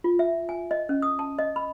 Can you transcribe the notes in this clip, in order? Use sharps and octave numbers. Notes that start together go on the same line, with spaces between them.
F4
E5
G#5
D#5
C#4
D#6
A5
D#5
B5